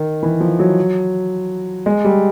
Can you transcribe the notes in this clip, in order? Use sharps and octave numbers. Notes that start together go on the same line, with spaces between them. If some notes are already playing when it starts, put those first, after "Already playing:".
Already playing: D#3
E3
F3
F#3
G#3
G3